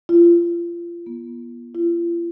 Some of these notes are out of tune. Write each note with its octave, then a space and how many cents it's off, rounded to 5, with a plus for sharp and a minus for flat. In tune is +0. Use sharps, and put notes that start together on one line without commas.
F4 -30
B3 -40
F4 -45